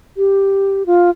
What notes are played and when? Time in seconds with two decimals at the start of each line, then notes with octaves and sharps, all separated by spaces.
0.17 G4
0.86 F4